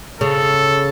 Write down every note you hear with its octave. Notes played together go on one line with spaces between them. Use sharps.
C#3 A4